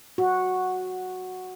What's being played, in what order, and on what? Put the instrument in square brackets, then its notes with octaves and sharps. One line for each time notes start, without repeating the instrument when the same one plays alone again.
[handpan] F#4